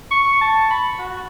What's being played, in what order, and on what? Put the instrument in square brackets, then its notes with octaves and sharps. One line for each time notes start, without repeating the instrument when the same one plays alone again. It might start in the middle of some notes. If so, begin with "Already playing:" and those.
[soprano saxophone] C#6
A5
B5
F#4